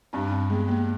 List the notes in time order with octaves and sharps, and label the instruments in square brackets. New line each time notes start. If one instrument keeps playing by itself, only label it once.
[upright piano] G2 [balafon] C4 D4
[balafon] C4
[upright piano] G#3 [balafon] B3
[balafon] A#3